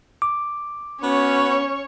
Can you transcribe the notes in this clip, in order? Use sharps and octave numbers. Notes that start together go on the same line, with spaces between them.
D6
B3 C#4 F#4 C#5 C#6